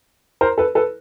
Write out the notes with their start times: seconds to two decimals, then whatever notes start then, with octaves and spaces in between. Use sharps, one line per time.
0.41 A#4 C5
0.58 A4 B4
0.75 A4 B4